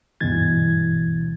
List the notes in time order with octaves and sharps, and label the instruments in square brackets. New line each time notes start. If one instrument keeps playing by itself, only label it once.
[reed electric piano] D2 G2 B2 E3 G#6 A6